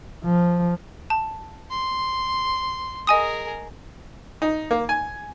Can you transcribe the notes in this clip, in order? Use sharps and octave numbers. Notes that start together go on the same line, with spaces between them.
F3
A5
C6
G#4 A#4 D#5 G#5 D#6
D#4
A#3
G#5